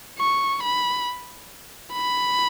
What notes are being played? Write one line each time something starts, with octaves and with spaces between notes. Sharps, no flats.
C#6
B5
B5